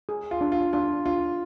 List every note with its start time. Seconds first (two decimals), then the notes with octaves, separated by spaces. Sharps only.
0.09 G#4
0.31 F4
0.41 D4
0.52 F4
0.73 D4 F4
1.06 D4 F4